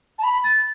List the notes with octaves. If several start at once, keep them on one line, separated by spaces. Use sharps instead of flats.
A5
B5
A6